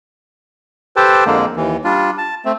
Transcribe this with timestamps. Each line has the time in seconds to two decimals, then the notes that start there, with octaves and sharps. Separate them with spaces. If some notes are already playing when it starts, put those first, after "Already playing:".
0.96 G4 A4 B4 C5 G5 A5
1.26 F2 D3 G#3 A#3
1.56 D#2 E3
1.84 G3 D4 F4
2.18 A5
2.45 A3 C4